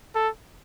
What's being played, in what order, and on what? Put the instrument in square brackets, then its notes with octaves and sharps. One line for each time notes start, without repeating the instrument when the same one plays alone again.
[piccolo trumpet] A4